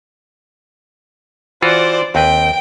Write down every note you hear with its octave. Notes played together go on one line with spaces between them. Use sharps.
E3 F4 F#4 C5 D5
D#2 C4 B4 G5